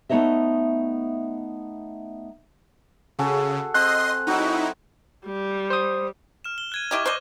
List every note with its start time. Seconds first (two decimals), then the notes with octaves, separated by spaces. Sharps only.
0.09 A3 B3 D#4 C#5 D#5 E5
3.19 C#3 F#4 G#4 A4
3.74 C4 D#5 C6 F#6
4.27 F#3 D#4 E4 F#4 G5
5.26 G3
5.70 C5 D#6
6.44 F6 E7
6.58 G7
6.72 F#6 G#6 D#7
6.91 E4 G4 D#5 C#6 G#6
7.06 C5 D5 D#5 F#6